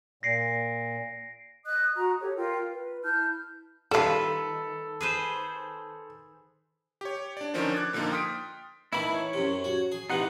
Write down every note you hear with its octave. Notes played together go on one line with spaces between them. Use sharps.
A#2 A#6 C7 D7
D#5 D#6 F#6
F#4 A#5 D#6
G4 A4 C#5
F4 A#4 G5
B4
E4 A5 F6 G6
D#3 G3 F4 A4 B4 E5
G#4 B4 C5
G4 C#5
D4 D5
D3 D#3 F3 C#4 D4 C5
D6 F#6 G#6 A6
A#2 D3 F3 A#3 D#4
G5 C6 D#6 F6 B6 D7
D#3 E3 A3 E4 B5
C#5
F#2 C3
F#4
G#4
C3 E3 D#4 F#5